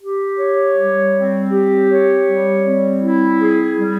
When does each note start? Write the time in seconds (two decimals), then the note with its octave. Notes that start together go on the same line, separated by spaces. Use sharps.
0.01 G4
0.38 C#5
0.76 G3
1.13 C4
1.51 G4
1.88 C#5
2.26 G3
2.64 C4
3.01 E4
3.40 G#4
3.77 G3